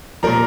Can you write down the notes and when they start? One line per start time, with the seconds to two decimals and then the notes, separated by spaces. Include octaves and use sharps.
0.23 A#2 F3 A#4 A#5